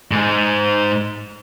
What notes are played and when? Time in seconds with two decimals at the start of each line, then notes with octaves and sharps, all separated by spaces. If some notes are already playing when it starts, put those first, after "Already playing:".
0.11 G#2 G#3